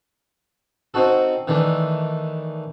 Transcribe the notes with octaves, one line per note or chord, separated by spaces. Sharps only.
C4 D#4 F#4 A4
D#3 E3 A3 D4